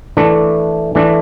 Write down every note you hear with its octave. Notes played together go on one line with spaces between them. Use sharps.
E3 A3 D4
E3 A3 D4